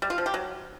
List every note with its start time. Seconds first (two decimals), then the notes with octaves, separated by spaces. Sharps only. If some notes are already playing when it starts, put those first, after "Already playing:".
0.02 G3
0.10 F4
0.18 F3
0.26 G4
0.34 F#3